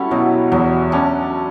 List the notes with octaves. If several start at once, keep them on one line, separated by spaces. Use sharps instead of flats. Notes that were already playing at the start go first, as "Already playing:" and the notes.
Already playing: G3 C#4 E4 F#4 A4
B2 F#3
E2 F#3
C#4 D4